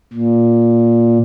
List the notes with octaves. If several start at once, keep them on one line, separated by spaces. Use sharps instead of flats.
A#2